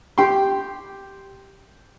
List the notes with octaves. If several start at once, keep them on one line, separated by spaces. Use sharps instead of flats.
G4 G5 C6